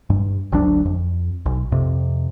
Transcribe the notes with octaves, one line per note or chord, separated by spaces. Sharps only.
G2
G#1 D2 F#3 D4
F2
B1
F2 C3